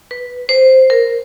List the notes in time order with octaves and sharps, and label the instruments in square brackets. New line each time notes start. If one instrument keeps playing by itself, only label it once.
[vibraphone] B4
C5
A#4